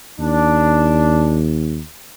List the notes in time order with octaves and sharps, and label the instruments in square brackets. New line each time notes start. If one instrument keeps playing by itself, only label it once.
[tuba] D#2 [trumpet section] D4